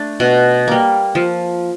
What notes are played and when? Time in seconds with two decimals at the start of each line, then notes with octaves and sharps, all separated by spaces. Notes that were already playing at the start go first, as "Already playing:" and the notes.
Already playing: A3 D4
0.20 B2
0.68 G3 A#3
1.15 F3